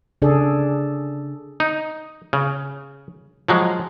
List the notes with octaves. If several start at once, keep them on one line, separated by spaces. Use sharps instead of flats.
C#3 D4 G#4 A4 D5
D#4
C#3
F3 F#3 G#3